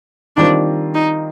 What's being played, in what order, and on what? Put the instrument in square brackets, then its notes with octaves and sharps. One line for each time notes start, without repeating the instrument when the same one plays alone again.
[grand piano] D#3 G3 C4 F4 [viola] D4
[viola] D#4